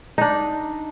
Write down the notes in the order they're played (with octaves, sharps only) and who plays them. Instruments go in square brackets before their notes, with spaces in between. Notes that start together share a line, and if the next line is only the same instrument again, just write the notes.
[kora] D4 D#4